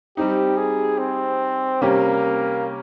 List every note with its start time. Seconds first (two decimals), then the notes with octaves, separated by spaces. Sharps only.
0.17 G3 C4 D#4 G4
0.57 G#4
0.99 C4
1.81 C3 G3 A#3 C#4 G4